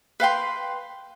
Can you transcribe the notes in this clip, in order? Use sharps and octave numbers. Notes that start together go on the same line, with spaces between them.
B4 F5 G5 C6